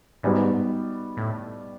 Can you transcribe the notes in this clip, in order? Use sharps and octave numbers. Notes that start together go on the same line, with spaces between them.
G#2 G3 B3 D#4 F#4
A2